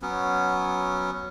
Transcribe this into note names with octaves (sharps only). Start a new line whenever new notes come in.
F#3 B3 C#4